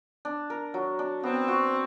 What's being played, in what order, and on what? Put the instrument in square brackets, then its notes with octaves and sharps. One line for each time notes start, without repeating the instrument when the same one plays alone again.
[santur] D4
A#4
F#3
D4
[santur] B3 [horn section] C4
[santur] F#4